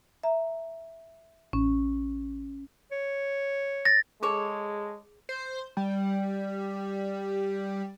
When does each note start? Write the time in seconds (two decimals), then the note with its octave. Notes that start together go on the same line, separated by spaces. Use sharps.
0.23 E5 A#5
1.53 A1 C#4
2.92 C#5
3.85 A6 A#6
4.23 G#3 G#4 A4 C#5
5.29 C5
5.77 G3